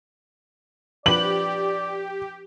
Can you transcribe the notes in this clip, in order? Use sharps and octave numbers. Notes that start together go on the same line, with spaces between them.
F3 D4 G4 B4 D5 F#7